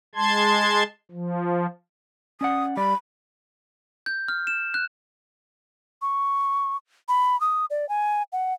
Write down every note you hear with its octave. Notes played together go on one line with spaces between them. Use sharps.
G#3 A5 C6 G#6
F3
C#4 D5 F#5 D#6
G3 D5 B5
G6
F6
E7
F#6
C#6
B5
D#6
D5
G#5
F#5